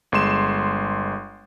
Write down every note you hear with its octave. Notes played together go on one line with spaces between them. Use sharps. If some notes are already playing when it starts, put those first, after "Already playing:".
G1 G#3 C6 E7